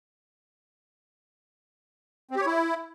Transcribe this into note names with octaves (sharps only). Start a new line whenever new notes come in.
C4
G4
C#5
E4